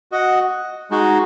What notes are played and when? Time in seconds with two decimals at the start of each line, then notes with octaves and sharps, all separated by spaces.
0.12 F#4 D#5 F#5
0.91 G#3 D#4 F#4